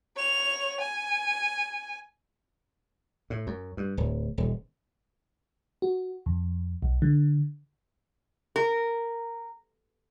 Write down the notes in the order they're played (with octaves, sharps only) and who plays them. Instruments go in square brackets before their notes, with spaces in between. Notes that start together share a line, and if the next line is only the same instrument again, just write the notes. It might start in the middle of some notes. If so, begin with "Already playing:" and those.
[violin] C#5 F7
G#5
[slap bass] A2
F#2
G2
D1
D#1
[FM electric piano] F#4
F2
B1
D3
[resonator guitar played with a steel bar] A#4